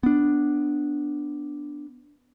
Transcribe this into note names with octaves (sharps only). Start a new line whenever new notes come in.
B3 D4